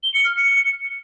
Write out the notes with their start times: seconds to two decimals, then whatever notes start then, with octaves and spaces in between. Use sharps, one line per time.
0.03 G7
0.14 C#7
0.25 F6
0.35 C#7